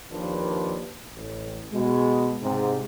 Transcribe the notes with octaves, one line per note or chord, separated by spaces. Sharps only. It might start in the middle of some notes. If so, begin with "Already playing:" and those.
D#2 F3 A#3 D4 B4
A1
B2 G#3
G#2 C3